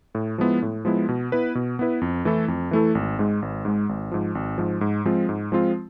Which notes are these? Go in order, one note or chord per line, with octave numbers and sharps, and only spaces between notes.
A2
F3 G#3 B3 E4
A2
F3 G#3 B3 E4
B2
B3 E4 B4
B2
B3 E4 B4
F2
E3 A3 E4 A4
F2
E3 A3 E4 A4
G#1
G#2 G#3
G#1
G#2 G#3
G#1
G#2 F3
G#1
G#2 F3
G#2
F3 G#3 C4 F4
G#2
F3 G#3 C4 F4